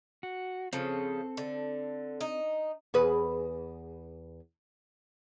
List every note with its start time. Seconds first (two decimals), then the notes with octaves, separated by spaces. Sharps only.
0.23 F#4
0.73 C#3 F3 C4 A4
1.37 D3
2.21 D#4
2.94 E2 G#4 B4